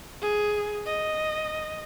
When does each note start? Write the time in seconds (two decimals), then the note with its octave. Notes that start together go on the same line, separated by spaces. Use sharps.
0.21 G#4
0.86 D#5